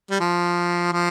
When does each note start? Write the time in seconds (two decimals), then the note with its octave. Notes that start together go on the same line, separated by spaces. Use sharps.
0.11 G3
0.20 F3
0.93 F3